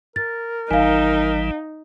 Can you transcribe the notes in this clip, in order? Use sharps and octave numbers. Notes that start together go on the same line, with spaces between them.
A#4 A6
G#1 E3 G3 D#4 F5 G#5